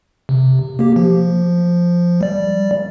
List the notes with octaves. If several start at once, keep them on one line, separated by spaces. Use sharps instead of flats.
C3
A#3 G4
F3
G3 D5